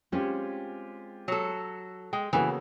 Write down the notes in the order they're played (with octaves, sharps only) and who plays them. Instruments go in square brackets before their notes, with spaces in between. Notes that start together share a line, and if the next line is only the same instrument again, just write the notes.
[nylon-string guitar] G#3 C4 C#4 [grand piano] F4 G4
[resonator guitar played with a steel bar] F#3 A4
[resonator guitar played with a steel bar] G#3 [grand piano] G5
[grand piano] C#3 B3 F#4 [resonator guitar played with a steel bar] E3 [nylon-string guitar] A#3 A4